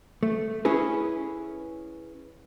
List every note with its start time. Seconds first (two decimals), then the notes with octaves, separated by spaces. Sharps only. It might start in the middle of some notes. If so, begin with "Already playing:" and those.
0.23 A3
0.65 C#4 E4 G#4 B4